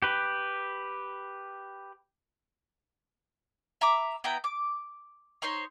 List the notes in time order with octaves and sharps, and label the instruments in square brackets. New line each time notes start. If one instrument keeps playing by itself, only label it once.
[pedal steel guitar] G4 B4
[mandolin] E5 A#5 B5 D6
B3 E4 G5 A#5
D6
D#4 C5 C#5 C6